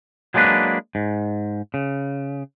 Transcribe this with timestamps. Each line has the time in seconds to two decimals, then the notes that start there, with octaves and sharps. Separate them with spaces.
0.34 F#3 G#3 A#3 D4 B4
0.95 G#2
1.74 C#3